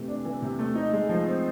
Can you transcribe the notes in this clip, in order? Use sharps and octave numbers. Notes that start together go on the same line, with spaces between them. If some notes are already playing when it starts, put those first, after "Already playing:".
Already playing: C3 E3 A3
D4
E3
C3
A3
D#4
G#3
F3
C4